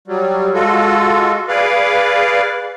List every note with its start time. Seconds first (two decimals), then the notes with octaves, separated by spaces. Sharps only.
0.08 F#3 G3
0.54 G#3 F4 F#4 A4
1.48 G#4 B4 D5 F5